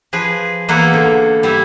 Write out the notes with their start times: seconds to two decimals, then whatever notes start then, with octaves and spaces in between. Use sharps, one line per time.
0.13 F3 G#4 B4
0.69 E2 A#3 E4 B4 F#5
0.93 D3
1.43 G3 E4 G4 E5